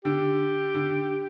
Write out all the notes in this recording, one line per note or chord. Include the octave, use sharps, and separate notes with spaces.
D3 G4
D3